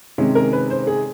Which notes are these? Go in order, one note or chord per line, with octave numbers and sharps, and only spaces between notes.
C3 D#3 G#3 C#4
A#4
B4
C5
G#4